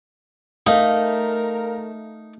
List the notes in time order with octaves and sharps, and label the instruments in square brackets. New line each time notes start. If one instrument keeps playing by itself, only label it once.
[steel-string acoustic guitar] A3 [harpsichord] D#4 [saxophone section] A#4 [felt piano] F5